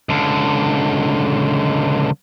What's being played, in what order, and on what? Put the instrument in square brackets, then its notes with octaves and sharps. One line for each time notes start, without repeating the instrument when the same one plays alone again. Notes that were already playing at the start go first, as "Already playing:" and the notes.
[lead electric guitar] C#2 D3